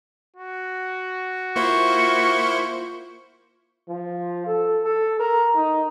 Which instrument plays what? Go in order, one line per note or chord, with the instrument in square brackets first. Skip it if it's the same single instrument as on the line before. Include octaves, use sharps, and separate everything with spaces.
[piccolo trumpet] F#4
[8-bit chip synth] A#3 E4 C5 [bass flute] F4 [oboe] C#6
[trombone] F3
A4
A4
A#4
D#4